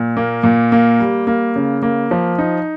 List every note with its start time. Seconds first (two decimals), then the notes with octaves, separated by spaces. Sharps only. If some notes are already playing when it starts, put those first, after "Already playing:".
Already playing: A#2
0.17 A#3
0.44 A#2
0.72 A#3
1.00 G3
1.27 A#3
1.56 C#3
1.83 A#3
2.11 F3
2.39 D#4